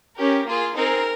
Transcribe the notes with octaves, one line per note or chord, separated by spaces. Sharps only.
C#4 G4 A#4
A#3 F4 G#4
C4 D#4 G#4 A#4